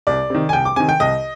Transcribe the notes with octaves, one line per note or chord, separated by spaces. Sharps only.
C2 D5
C3 D#3
G#5
C2 G5
D6
C3 D#3 G#5
G5
C2 D#5